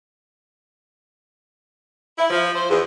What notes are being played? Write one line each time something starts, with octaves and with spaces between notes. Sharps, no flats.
E4
F3
C5
E2